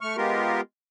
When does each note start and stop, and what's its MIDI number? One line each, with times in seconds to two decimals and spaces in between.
0.01 0.16 57
0.01 0.16 85
0.01 0.16 89
0.17 0.61 56
0.17 0.61 59
0.17 0.61 65
0.17 0.61 67
0.17 0.61 70